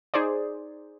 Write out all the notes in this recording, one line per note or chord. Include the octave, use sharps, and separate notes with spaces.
D#4 G#4 C5 D5